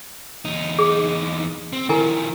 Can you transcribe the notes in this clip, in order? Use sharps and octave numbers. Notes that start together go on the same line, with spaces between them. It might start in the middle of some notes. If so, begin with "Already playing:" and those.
E2 D#4
G#4
C4
D#3 F3 E4 A#4 G#5